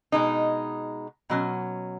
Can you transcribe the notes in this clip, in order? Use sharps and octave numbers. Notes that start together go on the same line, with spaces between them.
B2 G#3 D#4
B2 F#3 C#4